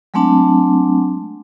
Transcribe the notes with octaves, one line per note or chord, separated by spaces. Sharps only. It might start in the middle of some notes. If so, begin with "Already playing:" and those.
F#3 G#3 A3 C4 D4 A5